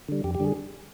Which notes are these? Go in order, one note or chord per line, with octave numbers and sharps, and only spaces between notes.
D3 G3
F2 G4
G4
D3 G3 G#4